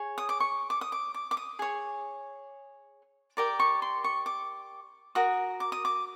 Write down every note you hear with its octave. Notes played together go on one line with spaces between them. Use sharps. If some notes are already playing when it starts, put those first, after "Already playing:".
Already playing: G#4 C#5
D#6
D6
C#6
D6
D#6
D6
D6
D6
D#6
G#4 C#5
G4 A#4 D5 D6
C#6
C6
C#6
D6
F#4 A#4 D#6
D6
D#6
D6